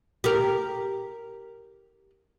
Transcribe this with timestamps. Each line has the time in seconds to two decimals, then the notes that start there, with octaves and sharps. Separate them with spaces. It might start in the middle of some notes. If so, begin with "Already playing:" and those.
0.24 G4 A#4